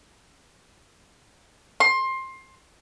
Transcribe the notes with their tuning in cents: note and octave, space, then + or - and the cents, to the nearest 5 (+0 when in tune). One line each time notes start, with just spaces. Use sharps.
C6 +20